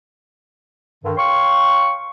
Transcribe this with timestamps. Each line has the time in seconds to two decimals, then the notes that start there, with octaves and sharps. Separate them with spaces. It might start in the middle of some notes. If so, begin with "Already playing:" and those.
1.04 G2 D3 D#3
1.17 C#5 F5 G5 C6 C#6